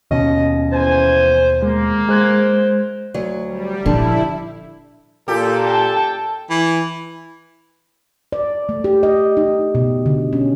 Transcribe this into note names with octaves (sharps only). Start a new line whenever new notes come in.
D#2 B2 C#4 D#5
E2 C5 G#5
G#3 A#3
G#3 C5 F#6 G#6
D2 F#3
G3
A#2 D3 F3 D4 E4
A#2 G4 A4
G5 A5
E3
D5
A3
G4
D#5
D#4
B2
D3
C#4